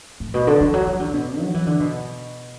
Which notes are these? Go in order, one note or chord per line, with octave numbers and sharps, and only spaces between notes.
A2
B2
D3
E3
F#3
E3
D3
B2
F#3
E3
D3
B2